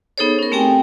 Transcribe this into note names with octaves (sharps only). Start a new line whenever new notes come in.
B3 D#4 G#4 A4 C5 C#5
C#4 A#4
A3 C4 G4 G5 G#5